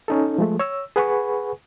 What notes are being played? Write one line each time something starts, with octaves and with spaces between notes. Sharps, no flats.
C#4 D#4 A4
F3 G#3 A3
C#5 E6
G#4 B4 F#5 G#5 B5 C#6